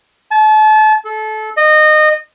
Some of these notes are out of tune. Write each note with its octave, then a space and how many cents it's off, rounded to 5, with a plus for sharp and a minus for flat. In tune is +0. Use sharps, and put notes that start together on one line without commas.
A5 -35
A4 -25
D#5 -25